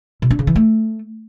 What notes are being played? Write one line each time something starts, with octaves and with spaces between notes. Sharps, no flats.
B2
D4
C#3
E3
A3